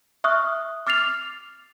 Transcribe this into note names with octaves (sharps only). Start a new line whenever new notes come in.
E5 C#6 D#6 F6 F#6
D6 F6 A6 C7 F7